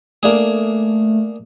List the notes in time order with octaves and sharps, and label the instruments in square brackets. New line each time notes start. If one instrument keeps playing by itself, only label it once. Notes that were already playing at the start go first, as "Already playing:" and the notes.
[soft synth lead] A3 [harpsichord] A#3 D4 G#4